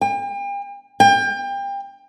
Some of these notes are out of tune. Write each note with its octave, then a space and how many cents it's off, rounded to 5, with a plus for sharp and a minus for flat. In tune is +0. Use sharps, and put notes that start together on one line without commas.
G5 +40
G5 +30